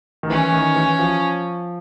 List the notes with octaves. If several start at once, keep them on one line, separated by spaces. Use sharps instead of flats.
D#3
E3 C#4
D#3
E3
F3